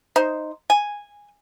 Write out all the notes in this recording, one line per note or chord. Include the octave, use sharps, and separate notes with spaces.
D#4 C5
G#5